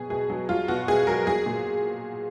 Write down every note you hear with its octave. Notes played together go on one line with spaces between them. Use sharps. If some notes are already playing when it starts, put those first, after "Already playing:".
Already playing: B2 F#3 G#4
B2 G#4
F#3
F#3 F4
B2 F#4
B2 G#4
F#3 A#4
F#3 G#4
A#2